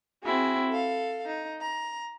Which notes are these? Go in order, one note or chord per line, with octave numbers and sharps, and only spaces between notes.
C4 E4 F#4 G#4
A4 F5
D#4
A#5